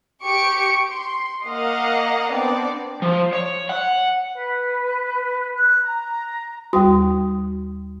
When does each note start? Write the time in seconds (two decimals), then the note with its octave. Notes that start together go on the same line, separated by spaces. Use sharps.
0.24 G4 C#6 C#7 D7
0.93 C6
1.46 A#3 D#5 F5 F#5
2.31 B3 C4 D4 D5
3.02 F3
3.33 C#5
3.69 F#5
4.33 B4
5.55 F#6
5.82 A#5
6.73 D#2 G3 F#4 D#6